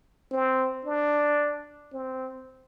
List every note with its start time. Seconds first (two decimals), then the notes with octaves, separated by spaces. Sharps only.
0.31 C4
0.85 D4
1.92 C4